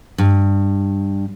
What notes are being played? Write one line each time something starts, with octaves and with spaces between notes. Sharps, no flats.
G2